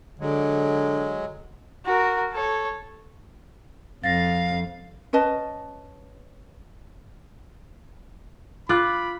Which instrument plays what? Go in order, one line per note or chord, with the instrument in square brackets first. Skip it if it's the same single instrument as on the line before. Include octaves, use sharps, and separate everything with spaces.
[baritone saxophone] D3 [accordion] F#3 G#3
[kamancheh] F#4 A#4
A4 C#5
[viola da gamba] F2 [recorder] F5 [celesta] A6 A#6
[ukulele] C#4 B4 D#5 A5
[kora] F4 [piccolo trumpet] B5 [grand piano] D6 F#6